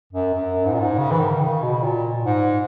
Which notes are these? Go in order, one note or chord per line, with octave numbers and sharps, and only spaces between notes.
F#2
F#2
G#2
A#2
G#2
C#3
E3
D#3
C#3
B2
A#2
G#2